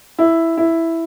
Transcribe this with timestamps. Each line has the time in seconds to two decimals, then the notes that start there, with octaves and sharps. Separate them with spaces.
0.19 E4
0.57 E4